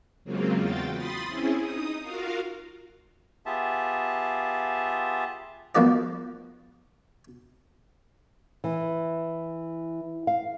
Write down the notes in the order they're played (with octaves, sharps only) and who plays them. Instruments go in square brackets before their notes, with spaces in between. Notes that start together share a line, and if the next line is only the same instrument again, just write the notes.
[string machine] C#3 F#3 G#3 A#3 C4 F4
E2 F4 F#4 G5 A6
B5 C6 D#6 A6
C4 C#4 E4 G#4
D#4 D#6
F4 F#4 A#4 F5
[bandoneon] B3 F4 G4 G#4 E5 A5
[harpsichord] F3 A#3 B3 F#4 D5 D#5
[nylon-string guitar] E3
F5